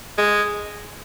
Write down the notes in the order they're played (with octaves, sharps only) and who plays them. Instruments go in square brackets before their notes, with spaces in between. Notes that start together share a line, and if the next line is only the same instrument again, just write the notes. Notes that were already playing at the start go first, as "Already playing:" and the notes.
[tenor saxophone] G#3